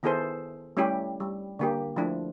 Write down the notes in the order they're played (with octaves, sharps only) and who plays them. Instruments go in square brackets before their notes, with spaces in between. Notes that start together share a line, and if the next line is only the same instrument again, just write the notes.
[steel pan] D#3 B3 E4 G#4 A4 C5
G3 A3 C#4 E4 G4
G3
D3 A#3 G4
F3 A3 D4 E4